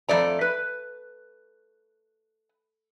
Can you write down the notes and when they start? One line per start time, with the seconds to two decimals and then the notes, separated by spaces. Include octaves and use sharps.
0.09 F2 A3 D5 A#5
0.41 B4